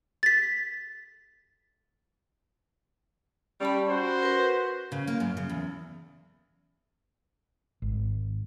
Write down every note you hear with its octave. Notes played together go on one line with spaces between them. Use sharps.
A6 B6
G3 C#4 A5 B5
F#4 C5
A#4 B4
C#3
A#3
F#2
C#3
E2
G#1